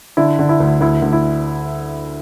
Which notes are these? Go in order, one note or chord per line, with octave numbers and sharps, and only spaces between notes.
D3 E4
D3
E4
D2
D2 E4
D2
E4